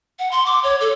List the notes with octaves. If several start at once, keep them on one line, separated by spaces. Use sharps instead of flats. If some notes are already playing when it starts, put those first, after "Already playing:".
F#5
C6
D6
C#5
A4